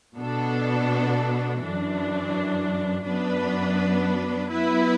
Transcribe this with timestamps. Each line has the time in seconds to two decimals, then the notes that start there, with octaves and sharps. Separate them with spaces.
0.17 B2 B3 D4 A4
1.61 F#2 E3 D4
3.05 F#2 F#3 B3 D4 B4
4.50 F#3 B3 E4 B4